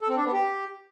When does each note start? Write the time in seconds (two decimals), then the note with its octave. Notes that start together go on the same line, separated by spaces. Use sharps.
0.01 A4
0.09 C4
0.17 D4
0.25 B3
0.33 G4